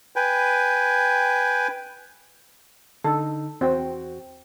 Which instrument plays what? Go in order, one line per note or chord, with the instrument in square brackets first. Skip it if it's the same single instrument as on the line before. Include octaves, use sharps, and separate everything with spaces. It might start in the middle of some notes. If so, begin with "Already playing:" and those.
[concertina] B4 G5 G#5
[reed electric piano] D3 D#4 [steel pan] A4
[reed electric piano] E2 F#4 G5 [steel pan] C4